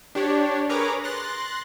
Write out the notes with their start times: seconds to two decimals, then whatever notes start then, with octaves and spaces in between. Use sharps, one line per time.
0.15 D4 G4 C#5
0.69 G#4 A#4 B4 C#5 A#5 D6
1.04 C6 F#6 A6 A#6